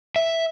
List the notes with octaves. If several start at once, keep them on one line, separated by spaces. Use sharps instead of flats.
E5